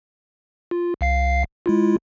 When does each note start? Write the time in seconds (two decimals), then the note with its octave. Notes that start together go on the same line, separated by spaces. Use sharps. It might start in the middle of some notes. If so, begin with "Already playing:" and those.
0.71 F4
1.01 C2 F5 C7
1.66 G#3 E4 F4